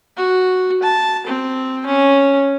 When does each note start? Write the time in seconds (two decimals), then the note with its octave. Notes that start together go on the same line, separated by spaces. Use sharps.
0.17 F#4
0.83 A5
1.26 C4
1.86 C#4